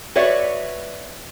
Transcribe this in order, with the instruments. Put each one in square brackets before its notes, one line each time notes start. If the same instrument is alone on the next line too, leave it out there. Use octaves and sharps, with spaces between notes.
[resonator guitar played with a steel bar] F#4 B4 C#5 D5 E5